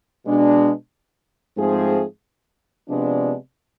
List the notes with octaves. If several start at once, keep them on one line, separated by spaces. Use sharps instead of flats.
B2 G#3 D4
G#2 F3 A3 C4 G#4
C3 F3 G#3 B3 D4